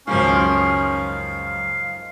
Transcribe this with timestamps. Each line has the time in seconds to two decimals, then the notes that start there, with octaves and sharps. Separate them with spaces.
0.07 C#2 F#2 D#3 F3 A#3 C#4 F5